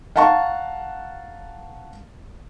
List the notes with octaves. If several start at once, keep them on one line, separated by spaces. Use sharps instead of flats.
F5 F#5 A5 A#5 C#6